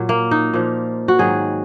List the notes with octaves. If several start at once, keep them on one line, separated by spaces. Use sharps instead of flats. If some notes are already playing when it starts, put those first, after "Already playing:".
Already playing: A#2 F#3
A#3
D#4
A#2 F3
F#4
G#2 D#3 F#3 G#4